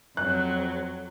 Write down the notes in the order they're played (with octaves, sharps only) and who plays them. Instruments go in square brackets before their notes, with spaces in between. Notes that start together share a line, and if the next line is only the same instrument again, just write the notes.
[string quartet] F2 F#3 [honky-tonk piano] F#6